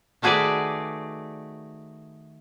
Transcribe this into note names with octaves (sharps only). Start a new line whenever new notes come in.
D#3 A3 F#4 G#4 B4 D5